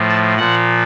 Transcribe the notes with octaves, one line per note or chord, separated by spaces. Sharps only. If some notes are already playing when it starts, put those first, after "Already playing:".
Already playing: A2 F3
A5
A#2 F3 F#5